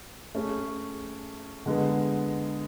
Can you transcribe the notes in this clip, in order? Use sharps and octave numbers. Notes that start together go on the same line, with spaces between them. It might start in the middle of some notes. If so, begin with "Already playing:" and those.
A3 C#4 G#4
D3 G#3 B3